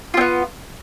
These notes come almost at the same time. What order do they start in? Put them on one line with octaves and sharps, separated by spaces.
F4 C4 B3